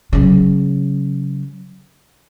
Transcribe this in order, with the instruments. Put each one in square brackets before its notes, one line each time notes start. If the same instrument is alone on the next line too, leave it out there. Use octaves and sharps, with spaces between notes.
[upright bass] C#3 F#3